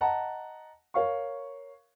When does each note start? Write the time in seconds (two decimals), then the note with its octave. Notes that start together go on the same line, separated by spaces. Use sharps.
0.01 D#5 F#5 A5 A#5
0.94 A#4 C#5 F5 C#6